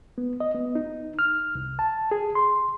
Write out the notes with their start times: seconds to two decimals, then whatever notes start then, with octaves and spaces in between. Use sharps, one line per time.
0.18 B3
0.40 D#5
0.55 B3
0.75 D#4
1.19 F6
1.55 C2
1.79 A5
2.11 G#4
2.35 C6